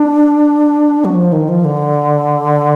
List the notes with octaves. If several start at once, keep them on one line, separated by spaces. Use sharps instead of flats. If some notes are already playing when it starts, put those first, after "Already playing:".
Already playing: D4
F#3
F3
D#3
F3
D3